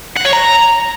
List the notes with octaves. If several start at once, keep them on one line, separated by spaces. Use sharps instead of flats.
F#5
C#5
A#5